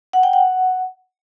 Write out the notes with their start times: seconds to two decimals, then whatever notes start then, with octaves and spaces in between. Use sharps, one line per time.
0.13 F#5
0.23 G5
0.33 F#5